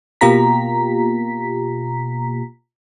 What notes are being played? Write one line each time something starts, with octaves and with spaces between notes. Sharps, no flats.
B2 A#3 F4 G4 A#5 B6